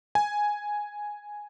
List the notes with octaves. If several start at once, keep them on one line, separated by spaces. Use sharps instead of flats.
G#5